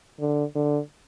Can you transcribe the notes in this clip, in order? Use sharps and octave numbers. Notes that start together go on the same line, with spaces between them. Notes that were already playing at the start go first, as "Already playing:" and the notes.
D3
D3